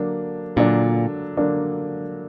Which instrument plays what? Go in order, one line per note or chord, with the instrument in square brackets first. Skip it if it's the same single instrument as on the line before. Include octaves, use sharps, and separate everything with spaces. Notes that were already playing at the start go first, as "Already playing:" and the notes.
Already playing: [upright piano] D3 F#3 A#3 D4
[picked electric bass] A#2 [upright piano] D3 F#3 A#3 D4
[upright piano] D3 F#3 A#3 D4